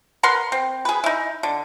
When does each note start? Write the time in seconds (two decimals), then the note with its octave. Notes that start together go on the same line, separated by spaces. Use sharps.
0.23 A#4 B4 F#5 C6
0.52 C4
0.85 G#4 B4
1.04 D#4 E4
1.43 D3